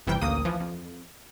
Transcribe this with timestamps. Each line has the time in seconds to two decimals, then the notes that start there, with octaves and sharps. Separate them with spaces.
0.07 G1 C3 E3 G3 G5
0.21 A1 D2 A#3 D#6
0.45 E3 F3
0.60 F2